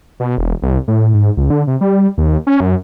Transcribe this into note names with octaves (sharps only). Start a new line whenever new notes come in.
B2
E1
C2
A2
G#2
C#2
D3
C3
G3
D#2
C#4
F#2